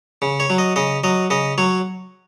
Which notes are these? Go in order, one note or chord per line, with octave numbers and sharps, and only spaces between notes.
C#3
C#5
F#3
D#5
C#3 D#5
F#3 D#5
C#3 D#5
F#3 C#5